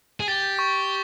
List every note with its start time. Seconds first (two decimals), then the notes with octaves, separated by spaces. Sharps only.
0.20 G#4
0.28 G4 A6
0.59 C#6